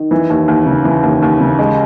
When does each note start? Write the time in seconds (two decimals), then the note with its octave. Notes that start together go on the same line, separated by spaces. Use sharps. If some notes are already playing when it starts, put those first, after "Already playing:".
Already playing: D#3
0.11 E3
0.30 D#2
0.48 D#2
0.66 C#3
0.85 E3
1.03 D#2
1.22 D#2
1.41 C#3
1.59 G#3